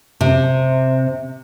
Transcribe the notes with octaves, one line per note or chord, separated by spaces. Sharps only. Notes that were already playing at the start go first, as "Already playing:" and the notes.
C3